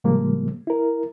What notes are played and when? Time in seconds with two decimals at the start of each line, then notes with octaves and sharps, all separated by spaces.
0.04 A2 C#3 F3 G3 G#3 A#3
0.67 E4 A#4